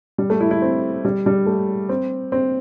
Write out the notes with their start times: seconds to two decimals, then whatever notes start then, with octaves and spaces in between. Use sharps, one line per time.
0.18 G3
0.30 A3
0.41 E4
0.51 E4
0.62 C4
1.05 G3
1.26 G3
1.46 A3
1.89 C4
2.32 C4